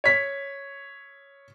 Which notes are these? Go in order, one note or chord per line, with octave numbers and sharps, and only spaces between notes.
C#5 B6